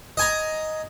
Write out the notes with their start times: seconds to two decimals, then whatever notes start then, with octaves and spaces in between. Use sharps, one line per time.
0.17 D#5 G#5 A#5